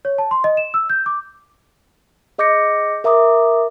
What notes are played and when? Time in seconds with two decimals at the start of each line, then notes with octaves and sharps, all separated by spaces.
0.05 C#5
0.18 A5
0.31 C6
0.44 D#5
0.57 E7
0.74 E6
0.90 G6
1.06 D6
2.38 G#4 D#5 D6 G6 A#6 C#7
3.04 A#4 E5 A#5 D6 D#6